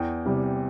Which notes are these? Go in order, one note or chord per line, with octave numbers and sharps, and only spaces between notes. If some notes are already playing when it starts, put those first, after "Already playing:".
Already playing: E2 G5
C3 G3